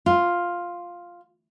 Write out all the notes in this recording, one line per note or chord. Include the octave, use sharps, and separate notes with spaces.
F4